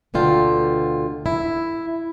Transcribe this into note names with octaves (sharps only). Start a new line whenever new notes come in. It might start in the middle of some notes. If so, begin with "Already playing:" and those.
D2 B2 D3 F4 G5
E4